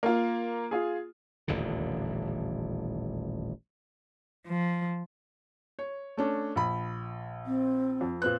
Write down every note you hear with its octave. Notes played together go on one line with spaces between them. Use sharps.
A#3 F4
F4 G#4
D#1 A1 E2 D3
F3
C#5
A3 C#4 D4
A#1 B5
C4
F2
A#2 C4 B4 F#6